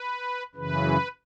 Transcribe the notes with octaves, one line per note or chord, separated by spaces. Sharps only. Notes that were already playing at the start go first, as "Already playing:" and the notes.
Already playing: B4
F#2 C#3 E3 B4